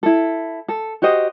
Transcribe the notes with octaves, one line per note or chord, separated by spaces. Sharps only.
E4 A4
A4
F#4 G4 C5 D#5